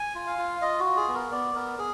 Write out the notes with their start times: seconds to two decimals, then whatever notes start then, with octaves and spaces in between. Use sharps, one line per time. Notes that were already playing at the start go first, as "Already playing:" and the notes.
Already playing: G#5
0.15 F4
0.27 F5
0.38 F4
0.62 F4 D#5
0.79 F#4
0.85 F4
0.97 G#4
1.08 B3
1.15 A#4
1.32 B3 D5
1.55 B3 A#4
1.78 G#4